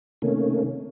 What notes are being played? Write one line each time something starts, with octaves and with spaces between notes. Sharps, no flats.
C3 D#3 A3 A#3 C#4